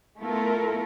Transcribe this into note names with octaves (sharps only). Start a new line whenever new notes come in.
A3 B3 E4 F4 A4 A#4